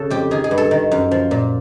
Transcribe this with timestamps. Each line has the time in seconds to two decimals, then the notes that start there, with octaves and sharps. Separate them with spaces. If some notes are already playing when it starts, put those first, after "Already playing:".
Already playing: C#3 A4
0.10 F2 G4
0.31 D#3 G#4
0.44 G#4
0.51 G2
0.58 A4
0.71 D#3
0.91 F#2
1.11 F3
1.31 A#2